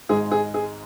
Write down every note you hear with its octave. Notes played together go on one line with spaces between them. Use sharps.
G#1 G#2 G#3 G#4
G#4
G#4